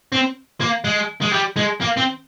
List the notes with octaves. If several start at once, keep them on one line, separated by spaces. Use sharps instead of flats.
C4
A#3
G#3
G#3
G3
G#3
A#3
C4